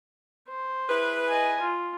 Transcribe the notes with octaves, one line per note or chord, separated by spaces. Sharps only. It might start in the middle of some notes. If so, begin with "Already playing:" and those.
C5
E4 G#4 B4
D#5 G#5
F4